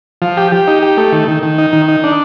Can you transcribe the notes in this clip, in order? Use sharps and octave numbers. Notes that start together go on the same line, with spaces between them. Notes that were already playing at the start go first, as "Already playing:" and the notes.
F3
G4
G4
D#4
G4
A3
D#3
D#3
D#3
D#4
D#3
D#4
D4